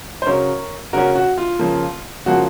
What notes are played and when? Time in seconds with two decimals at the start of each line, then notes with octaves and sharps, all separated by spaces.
0.22 C5
0.26 C#3 F#3 C#4 A#4 C#5
0.93 C#3 F#3 C#4 F#4 A#4
1.15 F#4
1.38 F4
1.59 C#3 F3 A#3
2.26 C#3 F3 A#3 F#4